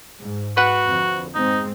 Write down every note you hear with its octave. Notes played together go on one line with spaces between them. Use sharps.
G#2
F#4 B4 F#5
F2 D3
G#2 G#3 C4 D#4